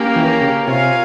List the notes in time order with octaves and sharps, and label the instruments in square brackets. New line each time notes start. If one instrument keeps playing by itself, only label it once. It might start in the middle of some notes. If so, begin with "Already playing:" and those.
Already playing: [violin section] A#3 C#4 G4 A#4
[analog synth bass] E3
C#3
[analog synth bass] C3 [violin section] F4 A#4 C#5 F5 G#5